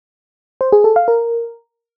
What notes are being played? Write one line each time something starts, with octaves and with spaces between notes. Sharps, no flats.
C5
G#4
A4
F5
A#4